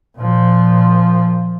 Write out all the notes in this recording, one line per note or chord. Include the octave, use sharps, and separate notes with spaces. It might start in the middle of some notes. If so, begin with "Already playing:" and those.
A#2 F3